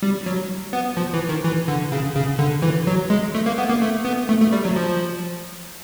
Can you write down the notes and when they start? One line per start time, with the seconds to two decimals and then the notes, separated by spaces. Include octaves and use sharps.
0.03 G3
0.26 F#3
0.73 B3
0.97 F3
1.14 E3
1.29 D#3
1.44 E3
1.68 D3
1.92 C#3
2.16 C#3
2.39 D3
2.62 E3
2.87 F#3
3.10 G#3
3.35 A3
3.46 A#3
3.58 B3
3.70 A#3
3.82 A3
4.05 B3
4.29 A3
4.41 A3
4.52 G3
4.65 F#3
4.76 F3